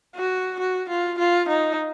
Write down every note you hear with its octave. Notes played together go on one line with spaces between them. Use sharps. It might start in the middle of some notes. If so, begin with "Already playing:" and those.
F#4
F#4
F4
F4
D#4